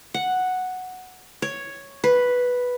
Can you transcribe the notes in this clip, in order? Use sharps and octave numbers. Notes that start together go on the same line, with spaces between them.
F#5
C#5
B4